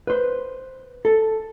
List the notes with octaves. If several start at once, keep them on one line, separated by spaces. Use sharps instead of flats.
B4 C5
A4